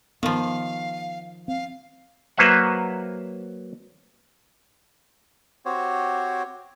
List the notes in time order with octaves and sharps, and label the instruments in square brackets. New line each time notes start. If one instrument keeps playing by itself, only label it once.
[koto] D#3 F3 [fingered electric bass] B3 [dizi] F5
[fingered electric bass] C4 [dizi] F5
[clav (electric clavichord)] F#3 A#3 B4 C5 E5 F#5
[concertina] C4 F#4 G4 C5 C#5